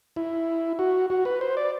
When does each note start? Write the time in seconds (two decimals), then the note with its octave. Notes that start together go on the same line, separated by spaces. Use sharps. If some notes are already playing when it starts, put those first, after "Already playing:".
0.16 E4
0.79 F#4
1.10 F#4
1.25 B4
1.41 C5
1.57 D5